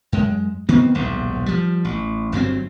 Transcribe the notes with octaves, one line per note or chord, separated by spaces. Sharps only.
F#2 G#3
D#3 B3 C4
D#1 B1 G#2
F3 G3
A1
G1 G2 F#3 C4